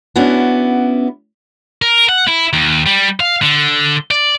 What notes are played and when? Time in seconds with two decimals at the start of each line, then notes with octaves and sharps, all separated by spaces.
0.16 B3 C#4 D4 E4 F#4
1.82 A#4
2.09 F#5
2.28 E4
2.53 D#2
2.86 G3
3.20 F5
3.42 D3
4.11 D5